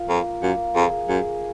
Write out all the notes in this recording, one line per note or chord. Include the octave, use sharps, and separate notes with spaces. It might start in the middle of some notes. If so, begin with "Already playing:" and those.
Already playing: F4 A#4
F2 A#3
F#2 A#3
F2 G#4
F#2 G#4